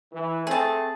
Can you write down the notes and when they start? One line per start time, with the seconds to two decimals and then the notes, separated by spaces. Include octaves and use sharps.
0.13 E3
0.47 A3 C4 G#4 A5